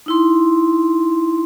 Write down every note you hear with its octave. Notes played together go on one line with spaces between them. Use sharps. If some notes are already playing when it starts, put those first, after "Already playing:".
D#4 E4 C6